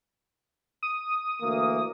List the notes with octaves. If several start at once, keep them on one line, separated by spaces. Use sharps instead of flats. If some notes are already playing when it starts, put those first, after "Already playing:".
D#6
D2 E3 A#3